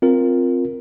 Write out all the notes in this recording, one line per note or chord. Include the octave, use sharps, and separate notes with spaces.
C4 F4 A#4